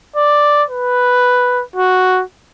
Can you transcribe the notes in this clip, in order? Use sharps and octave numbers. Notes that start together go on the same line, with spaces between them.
D5
B4
F#4